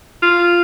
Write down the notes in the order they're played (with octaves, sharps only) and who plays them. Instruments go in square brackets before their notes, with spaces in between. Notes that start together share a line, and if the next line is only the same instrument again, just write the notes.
[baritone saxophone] F4